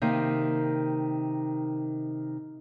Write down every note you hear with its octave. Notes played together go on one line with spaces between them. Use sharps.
C3 D#3 A#3